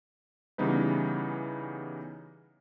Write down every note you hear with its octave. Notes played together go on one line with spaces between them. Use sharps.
C#3 E3 G3 B3 D#4 B4